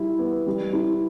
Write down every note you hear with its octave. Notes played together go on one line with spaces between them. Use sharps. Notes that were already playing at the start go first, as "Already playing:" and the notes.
Already playing: G3 E4
B3
G3
E4